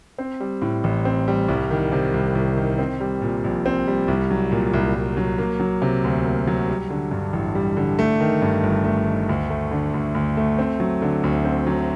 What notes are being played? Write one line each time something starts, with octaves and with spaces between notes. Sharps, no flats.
C4
G3
A2
A1
C4
G3
C2
D#3
C3
C2
C2
D#3
C4
G3
A#2
A#1
C4
G3
C2
F#3
A#2
C2
C2
F#3
A#3
F#3
C3
D2
A#3
F#3
G3
D3
G2
A1
G3
D3
A3
D#3
G2
G1
A3
D#3
D2
A3
D3
D2
D2
A3
C4
F#3
D3
D2
C4
F#3